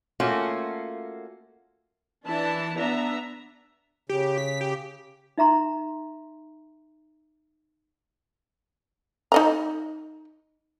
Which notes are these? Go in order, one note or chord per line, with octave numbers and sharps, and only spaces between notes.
A3 A#3 C#4 F4 F#4
E3 D4 E4 A5
B3 D4 E5 A#5
C#3 G4
B6
G4
D#4 E5 A#5 C6
D#4 D#5 A#5